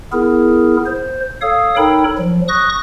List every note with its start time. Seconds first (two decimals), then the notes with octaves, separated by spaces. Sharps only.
0.12 B3 E4 G#4 A#4
0.86 C5
1.42 A4 C#5 F5 D#6
1.77 D#4 A4 A#4 C#5 G5 B5
2.18 F3 F#3
2.48 C#6 D#6 F#6 A#6